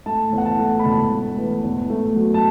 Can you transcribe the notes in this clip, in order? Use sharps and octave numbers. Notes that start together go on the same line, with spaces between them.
A3 A5
E2
F#5
A5
A3
B5
E1 A5
A3
E3
E2
A3
F#3
A5